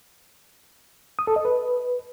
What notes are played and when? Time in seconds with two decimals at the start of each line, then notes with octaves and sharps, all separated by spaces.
1.19 D#6
1.27 A4
1.36 D#5
1.45 B4